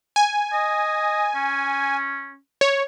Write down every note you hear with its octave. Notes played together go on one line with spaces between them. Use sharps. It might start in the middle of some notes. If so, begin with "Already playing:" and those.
G#5
D#5
C#4
C#5